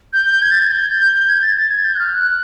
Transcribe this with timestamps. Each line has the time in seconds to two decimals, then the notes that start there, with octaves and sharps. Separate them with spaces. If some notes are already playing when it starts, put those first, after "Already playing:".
0.13 G6
0.42 G#6
0.51 A6
0.62 G#6
0.71 G6
1.28 G#6
1.42 A6
1.57 A6
1.71 G#6
1.85 G6
1.95 F#6
1.99 F6
2.14 F#6